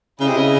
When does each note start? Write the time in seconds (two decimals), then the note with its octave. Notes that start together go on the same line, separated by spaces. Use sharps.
0.20 C#3 E4 G#4 D#5
0.28 C3
0.37 C#3